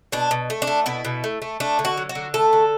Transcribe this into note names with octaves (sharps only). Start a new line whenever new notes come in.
B2 D4
B2
A3
D4
A3
B2 E4
B2
A3
A3
A3 D4
D3
F#4
F#3
F#4
D3
A3 A4
D3